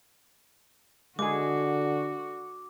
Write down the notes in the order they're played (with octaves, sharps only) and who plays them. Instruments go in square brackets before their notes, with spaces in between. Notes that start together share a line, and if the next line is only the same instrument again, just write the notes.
[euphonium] D3 [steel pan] G#3 G#4 [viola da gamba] F#4 [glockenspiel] D6